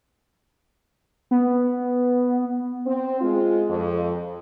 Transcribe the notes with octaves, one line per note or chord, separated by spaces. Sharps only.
B3
C4
G#3 F4
F2